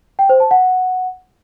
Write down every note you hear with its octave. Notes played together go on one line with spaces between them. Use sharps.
G5
C5
A5
F#5